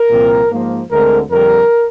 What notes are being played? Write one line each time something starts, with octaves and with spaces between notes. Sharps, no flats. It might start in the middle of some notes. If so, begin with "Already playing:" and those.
Already playing: A#4
C2 A#2 F3 C4
G#2 F3 A#3
D2 D3 G#3 C4 A#4
F2 D3 G3 A#4